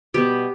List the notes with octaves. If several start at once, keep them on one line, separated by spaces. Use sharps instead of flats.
B2 G3 B3 G4